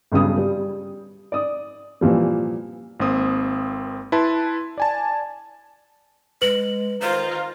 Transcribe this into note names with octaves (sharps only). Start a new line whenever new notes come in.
B1 G2 C#3 D#6
G3
D5 D#6
A#2 E3 F3 G3
G#1 A#3 C4 D#6
E4 B4 A5 C6
D5 G#5 A5
G#3 B4 F#7
D#3 F4 C5 A#5